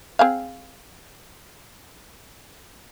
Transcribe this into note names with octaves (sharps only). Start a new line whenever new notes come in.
C4 G#4 F5